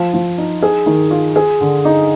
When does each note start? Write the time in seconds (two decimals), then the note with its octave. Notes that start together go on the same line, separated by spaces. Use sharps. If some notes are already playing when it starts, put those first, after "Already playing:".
Already playing: F3
0.14 F3
0.38 D#4
0.62 G#4
0.86 D#3
1.11 F4
1.36 G#4
1.61 D3
1.85 D#4